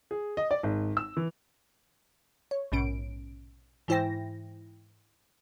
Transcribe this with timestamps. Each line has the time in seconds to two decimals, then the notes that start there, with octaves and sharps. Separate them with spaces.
0.11 G#4
0.37 D#5
0.51 D5
0.63 G#1
0.97 E6
1.17 E3
2.51 C#5
2.72 A#1 G#2 B2 C#4 D7
3.88 G#2 E3 E4 C5 G5 A#6